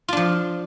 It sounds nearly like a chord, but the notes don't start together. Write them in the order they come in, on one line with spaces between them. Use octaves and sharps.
F4 D4 F3